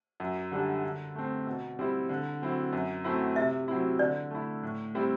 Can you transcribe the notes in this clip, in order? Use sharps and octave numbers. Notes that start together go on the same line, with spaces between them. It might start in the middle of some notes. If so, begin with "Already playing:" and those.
F#2
D3 G3 D4
D3
A3 C4
B2
G3 C4 E4
D3
F#3 C4 E4
F#2
F#3 A3 C4 E4
C3 E5
F#3 C4 E4
D3 D5
A3 E4
A2
G3 C4 E4